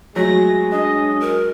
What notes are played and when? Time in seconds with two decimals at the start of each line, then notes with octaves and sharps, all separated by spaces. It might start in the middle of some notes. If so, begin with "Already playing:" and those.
0.16 F#3 G#3 A3 A#6
0.72 D4 D#5
1.21 A#4